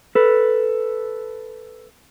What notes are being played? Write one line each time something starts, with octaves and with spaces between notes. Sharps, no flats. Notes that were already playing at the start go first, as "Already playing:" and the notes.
A4 B4